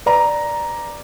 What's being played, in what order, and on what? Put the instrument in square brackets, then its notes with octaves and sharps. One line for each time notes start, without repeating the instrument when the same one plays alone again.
[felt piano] B4 D5 A#5